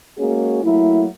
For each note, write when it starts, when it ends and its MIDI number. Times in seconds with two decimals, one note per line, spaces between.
0.18 0.61 56
0.18 0.61 58
0.18 0.61 61
0.18 0.61 66
0.18 0.61 68
0.63 1.06 54
0.63 1.06 57
0.63 1.06 58
0.63 1.06 64